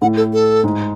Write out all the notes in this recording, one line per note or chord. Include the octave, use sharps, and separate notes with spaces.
A2 F#5
A4
A4
G#2